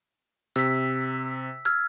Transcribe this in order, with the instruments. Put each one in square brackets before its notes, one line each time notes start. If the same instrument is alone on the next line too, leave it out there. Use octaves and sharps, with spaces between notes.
[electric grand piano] C3 [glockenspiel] E6 B6
[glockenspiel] E6 F6 G#6